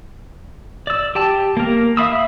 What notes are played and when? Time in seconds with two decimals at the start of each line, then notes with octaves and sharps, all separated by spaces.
0.87 D5 E6
1.15 G4 G5 A5
1.57 A#3 A#4
1.97 E5 F5 B5 D#6 E6